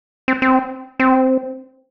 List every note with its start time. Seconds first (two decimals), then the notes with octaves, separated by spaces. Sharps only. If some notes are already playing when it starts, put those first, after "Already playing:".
0.28 C4
0.42 C4
0.99 C4